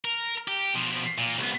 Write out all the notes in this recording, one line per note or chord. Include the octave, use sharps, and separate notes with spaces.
A#4
G4
B2 F3
A#2
C2 B3